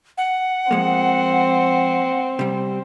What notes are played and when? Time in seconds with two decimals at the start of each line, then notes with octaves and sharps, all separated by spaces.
0.18 F#5
0.71 F3 G#3 A#3 C4
2.39 C3 G3